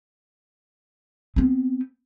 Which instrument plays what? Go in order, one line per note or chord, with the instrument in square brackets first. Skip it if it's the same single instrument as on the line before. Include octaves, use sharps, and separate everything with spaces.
[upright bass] B3 C4